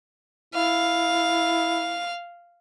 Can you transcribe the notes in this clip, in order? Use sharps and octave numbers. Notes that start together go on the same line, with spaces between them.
E4 F5